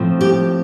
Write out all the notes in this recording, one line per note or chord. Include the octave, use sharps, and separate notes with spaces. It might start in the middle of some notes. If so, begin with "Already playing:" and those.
Already playing: A2 F3 C4
G4